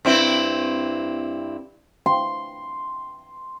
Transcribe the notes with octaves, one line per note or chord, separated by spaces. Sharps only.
G2 C4 E4
C6